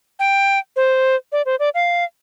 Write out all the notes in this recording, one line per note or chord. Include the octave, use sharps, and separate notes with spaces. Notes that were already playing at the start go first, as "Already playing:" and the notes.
G5
C5
D5
C5
D5
F5